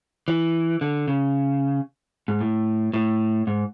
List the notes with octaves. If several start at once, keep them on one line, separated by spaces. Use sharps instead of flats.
E3
D3
C#3
G#2
A2
A2
G#2